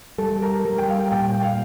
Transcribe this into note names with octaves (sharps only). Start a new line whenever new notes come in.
G3 A4
A#4
G3 A#4
G5
F5
A#2 G5
F5